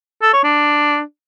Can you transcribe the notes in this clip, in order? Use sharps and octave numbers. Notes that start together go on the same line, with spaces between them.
A4
C#5
D4